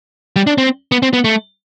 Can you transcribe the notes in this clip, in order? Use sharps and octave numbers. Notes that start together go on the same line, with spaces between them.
G3
D4
C4
B3
C4
B3
A3